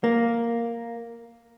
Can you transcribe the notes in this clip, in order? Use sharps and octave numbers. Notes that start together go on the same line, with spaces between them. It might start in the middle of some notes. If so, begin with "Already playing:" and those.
A#3